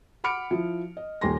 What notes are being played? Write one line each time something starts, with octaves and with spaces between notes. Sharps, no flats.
F#5 B5 D6 F6 C#7 D7
F3 E4
D#5
D#1 D#2 G4 G#5 C6 A#6